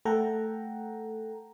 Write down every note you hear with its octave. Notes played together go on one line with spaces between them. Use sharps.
A3 A4 F#5 G5 A#5